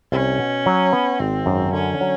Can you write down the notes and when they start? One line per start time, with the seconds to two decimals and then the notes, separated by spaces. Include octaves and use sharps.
0.12 C2 C#4
0.39 B2
0.66 F#3
0.93 B3
1.20 G#1 C4
1.46 F#2
1.73 D3 C#4
2.01 F#3